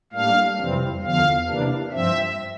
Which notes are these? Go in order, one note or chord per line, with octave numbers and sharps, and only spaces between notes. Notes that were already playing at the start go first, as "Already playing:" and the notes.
A2 G3 A#3 D4 F5
F2 C3 E3 G3 C4
E2 D3 F3 F5
C3 E3 A#3 D4
G2 F3 C4 E5